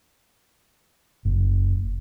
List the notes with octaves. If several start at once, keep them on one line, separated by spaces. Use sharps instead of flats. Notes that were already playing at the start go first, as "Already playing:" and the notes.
F#1